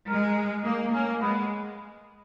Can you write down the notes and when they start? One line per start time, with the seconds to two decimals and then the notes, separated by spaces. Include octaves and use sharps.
0.08 G#3 A#4
0.64 A#3 D#4
0.93 A#3 C#4
1.22 G#3 B3